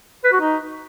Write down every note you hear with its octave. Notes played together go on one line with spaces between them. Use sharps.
B4
F#4
D#4